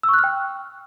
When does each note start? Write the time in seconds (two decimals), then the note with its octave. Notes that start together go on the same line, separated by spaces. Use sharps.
0.03 E6
0.08 C#6
0.14 F#6
0.19 F6
0.24 G5